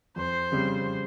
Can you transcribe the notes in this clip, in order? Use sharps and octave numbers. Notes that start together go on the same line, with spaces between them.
F2 C5
C#3 G3 C4 G4